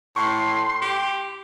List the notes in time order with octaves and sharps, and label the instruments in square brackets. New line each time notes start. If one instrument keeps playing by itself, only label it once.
[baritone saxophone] A2 [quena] C6 [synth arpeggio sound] C#6
[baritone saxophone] G4